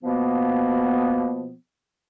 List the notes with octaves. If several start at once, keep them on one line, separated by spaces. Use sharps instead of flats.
B2 F3 A#3 B3